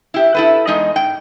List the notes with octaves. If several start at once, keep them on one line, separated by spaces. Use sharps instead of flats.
E4 G4
E4 A4 B4
E2 G#3 D#4 D#5
G#2 G5